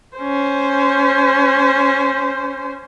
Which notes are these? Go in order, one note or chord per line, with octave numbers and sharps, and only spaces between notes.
C#4 C5